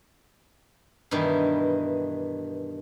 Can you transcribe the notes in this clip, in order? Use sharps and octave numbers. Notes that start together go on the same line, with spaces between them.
G2 B2 D#3 E3